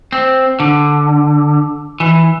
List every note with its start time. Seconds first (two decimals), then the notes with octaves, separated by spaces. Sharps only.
0.12 C4
0.60 D3
2.00 E3